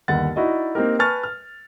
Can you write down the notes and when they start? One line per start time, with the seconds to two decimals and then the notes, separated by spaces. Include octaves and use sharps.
0.08 G1 D#2 F#5 A6
0.36 D#4 E4 F#4 D5 D#5
0.75 A#3 C4 D#4 G4 A#4
0.99 B4 G#5 A5 C#6 F6 A6
1.23 F6